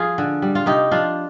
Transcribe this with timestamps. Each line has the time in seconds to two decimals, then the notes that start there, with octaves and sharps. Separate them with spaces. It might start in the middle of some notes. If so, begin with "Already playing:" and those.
Already playing: F3 F4 G#4
0.18 D3
0.42 G3
0.55 F4
0.66 C3 D#4 G4
0.91 F3 D4 F4